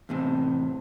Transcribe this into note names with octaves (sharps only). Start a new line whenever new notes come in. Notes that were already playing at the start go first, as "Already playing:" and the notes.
E2 A2 C3